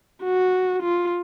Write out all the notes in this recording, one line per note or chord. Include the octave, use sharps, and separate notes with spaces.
F#4
F4